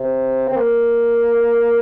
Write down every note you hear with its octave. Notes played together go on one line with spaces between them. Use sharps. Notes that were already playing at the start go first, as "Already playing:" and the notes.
Already playing: C3
C4
A#3